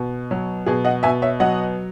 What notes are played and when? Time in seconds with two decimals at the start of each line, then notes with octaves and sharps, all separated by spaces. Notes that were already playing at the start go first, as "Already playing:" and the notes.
Already playing: B2
0.31 F#3
0.66 B2 G#4
0.85 D#5 F#5
1.03 B2 E5 G#5
1.22 C#5 E5
1.40 F#3 D#5 F#5